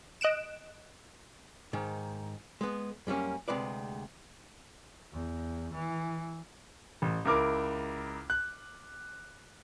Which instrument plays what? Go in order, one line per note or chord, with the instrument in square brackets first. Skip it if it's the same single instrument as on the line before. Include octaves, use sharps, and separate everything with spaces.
[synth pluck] D#5 F#6 D7 E7
[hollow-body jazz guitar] G#2 D#3
G#3 B3
F#2 G3 A#3 C#4
D2 C3 G#3 B4 D5
[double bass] E2
E3
[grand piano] A1
C#2 E4 A#4 D6
F#6